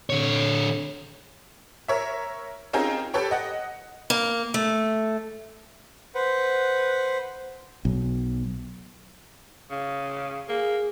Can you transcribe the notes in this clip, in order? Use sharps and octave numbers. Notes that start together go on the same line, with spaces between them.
D3 C#5
A#4 C#5 E5
C4 C#4 D#4 F4 G#4 A#4
G4 A4 B4 C#5 G5
D#5 F#5
A#3
A3
B4 C5 F#5
B1
C#3
A#3 G#4